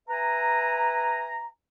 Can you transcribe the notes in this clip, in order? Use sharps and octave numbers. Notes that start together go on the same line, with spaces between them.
B4 E5 G#5 A#5